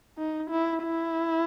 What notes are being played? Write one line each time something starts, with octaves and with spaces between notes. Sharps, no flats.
D#4
E4
E4